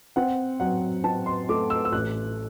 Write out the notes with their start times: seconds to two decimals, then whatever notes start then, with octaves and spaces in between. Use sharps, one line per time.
0.16 C4 F#5
0.60 F#3 F#5
1.04 C4 A5
1.26 C6
1.49 A3 D6
1.70 E6
1.85 E6
1.92 A1 F#6